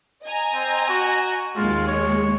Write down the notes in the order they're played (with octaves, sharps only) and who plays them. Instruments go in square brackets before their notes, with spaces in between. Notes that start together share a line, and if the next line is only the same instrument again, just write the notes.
[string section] D#5 G#5 A#5
[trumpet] C4
F#4
[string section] D#2 G#3 [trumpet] F4
[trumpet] C#5